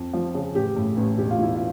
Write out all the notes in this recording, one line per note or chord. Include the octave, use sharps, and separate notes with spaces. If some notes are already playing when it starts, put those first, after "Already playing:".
Already playing: F2
F3
C#3
A1 G4
A2
A1
E1 G4
F4
E1 E4
F4